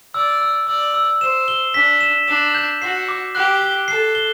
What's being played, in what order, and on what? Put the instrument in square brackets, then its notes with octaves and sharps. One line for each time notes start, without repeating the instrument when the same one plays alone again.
[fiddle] D5 [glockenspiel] E6
[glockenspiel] E6
[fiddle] D5 [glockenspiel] E6
[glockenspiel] E6
[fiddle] C5 [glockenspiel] E7
[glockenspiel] G7
[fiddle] D4 [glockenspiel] B6
[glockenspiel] E7
[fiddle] D4 [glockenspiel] E7
[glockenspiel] G6
[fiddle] F#4 [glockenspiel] C7
[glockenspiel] D6
[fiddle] G4 [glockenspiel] F#6
[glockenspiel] G7
[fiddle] A4 [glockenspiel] C7
[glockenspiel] G7